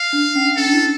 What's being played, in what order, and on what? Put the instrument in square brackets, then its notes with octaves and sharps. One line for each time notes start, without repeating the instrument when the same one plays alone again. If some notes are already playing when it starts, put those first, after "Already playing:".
Already playing: [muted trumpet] F5
[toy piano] D4
C#4
[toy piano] C#4 [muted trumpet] A4
[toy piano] D4
E4